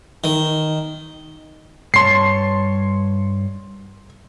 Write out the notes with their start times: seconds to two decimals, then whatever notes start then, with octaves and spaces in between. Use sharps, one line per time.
0.24 D#3
1.94 G2 C#5 A5 C6 C7